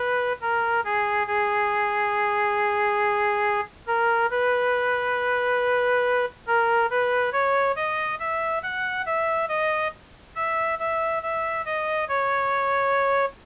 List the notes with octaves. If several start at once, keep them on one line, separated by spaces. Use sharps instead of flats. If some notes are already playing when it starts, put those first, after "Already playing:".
Already playing: B4
A#4
G#4
G#4
A#4
B4
A#4
B4
C#5
D#5
E5
F#5
E5
D#5
E5
E5
E5
D#5
C#5